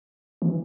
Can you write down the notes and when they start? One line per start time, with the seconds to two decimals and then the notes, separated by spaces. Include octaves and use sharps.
0.42 E3